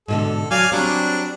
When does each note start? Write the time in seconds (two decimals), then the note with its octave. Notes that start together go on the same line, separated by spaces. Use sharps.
0.08 G#2 B2 D3 A4
0.51 F#3 D5 F5 G#5
0.72 F#3 G3 C4 D4